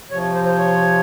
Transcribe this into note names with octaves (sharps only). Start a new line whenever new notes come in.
C3 F3 C#5
C5
C5
C#5